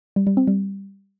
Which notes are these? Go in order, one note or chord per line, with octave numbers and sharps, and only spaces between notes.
G3
G3
C4
G3